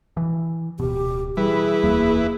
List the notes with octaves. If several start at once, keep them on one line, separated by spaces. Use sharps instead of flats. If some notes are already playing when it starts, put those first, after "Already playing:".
E3
D1 B2 G4
E3 G3 E4 G#4 B4
D1 E2 A#3